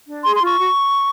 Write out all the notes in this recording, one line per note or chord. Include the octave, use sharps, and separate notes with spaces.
D4
G#4 C6
C6
F4 C#6
F#4